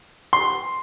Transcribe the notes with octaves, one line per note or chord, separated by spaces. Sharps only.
C6